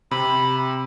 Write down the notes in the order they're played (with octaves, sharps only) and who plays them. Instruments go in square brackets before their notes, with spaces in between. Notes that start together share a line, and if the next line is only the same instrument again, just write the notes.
[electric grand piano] C3 [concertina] B5